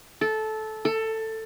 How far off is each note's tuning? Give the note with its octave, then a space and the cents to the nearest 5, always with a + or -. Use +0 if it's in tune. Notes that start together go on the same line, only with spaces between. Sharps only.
A4 -15
A4 +15